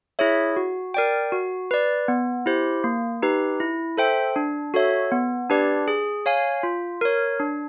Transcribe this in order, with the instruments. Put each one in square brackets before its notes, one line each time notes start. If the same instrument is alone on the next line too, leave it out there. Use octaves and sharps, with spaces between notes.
[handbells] E4 G#4 C#5 E5
F#4
A#4 D5 G5
F#4
B4 D5
B3
E4 G4 C5
A#3
D#4 G4 B4
E4
A4 C5 E5 G5
D4
F#4 A4 C#5 E5
B3
D4 G4 B4 D5
G#4
C#5 F5 G#5
F4
A#4 C#5
D4